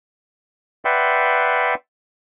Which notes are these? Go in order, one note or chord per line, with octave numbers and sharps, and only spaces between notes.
B4 D5 E5 F#5 G5 C6